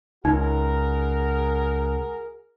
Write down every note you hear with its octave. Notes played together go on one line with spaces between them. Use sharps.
C#2 D#4 F#4 G#4 A#4